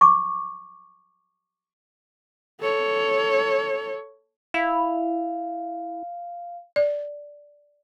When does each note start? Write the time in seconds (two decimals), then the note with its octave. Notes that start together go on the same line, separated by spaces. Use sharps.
0.01 C#6 D6
2.61 A4 C#5
4.54 E4 F5
6.76 D5